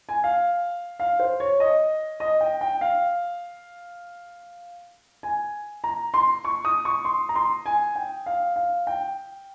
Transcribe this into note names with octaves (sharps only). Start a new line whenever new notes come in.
G#5
F5
F5
C5
C#5
D#5
D#5
G5
G5
F5
G#5
A#5
C6
C#6
D#6
C#6
C6
A#5
C6
G#5
G5
F5
F5
G5